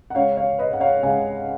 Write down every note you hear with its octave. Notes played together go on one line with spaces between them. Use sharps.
F#5
C#2 C#3 C#5 F5
C#5 F5
B4 D#5
F#5
C#5 F5
C#2 C#3 F5 G#5